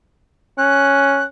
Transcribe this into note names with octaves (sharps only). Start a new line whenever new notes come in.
C#4 F#6